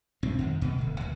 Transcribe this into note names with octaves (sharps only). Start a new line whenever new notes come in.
A#1 G2 C4
F2 D#3
C#2 B2
D1 G1
D#2